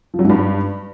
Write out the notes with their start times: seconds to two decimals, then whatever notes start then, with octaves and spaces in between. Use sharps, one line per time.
0.14 F3
0.19 F#3
0.24 G#2
0.29 G2